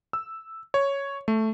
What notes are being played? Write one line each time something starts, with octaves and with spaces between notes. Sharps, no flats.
E6
C#5
A3